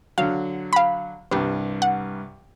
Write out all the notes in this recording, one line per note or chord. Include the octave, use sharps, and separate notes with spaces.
D3 F#3 F5
F5 B5
C2 G2 G4 B4
F#5